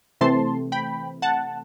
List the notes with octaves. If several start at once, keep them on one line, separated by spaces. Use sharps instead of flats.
C3 E3 A3 C4 A5 C6
G5 B5
F#5 A5